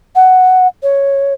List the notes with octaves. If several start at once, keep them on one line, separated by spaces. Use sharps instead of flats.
F#5
C#5